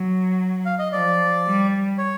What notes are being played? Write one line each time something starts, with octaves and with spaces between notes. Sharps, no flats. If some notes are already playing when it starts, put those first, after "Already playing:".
Already playing: F#3
F5
D#5
F3 D5
G3
C#5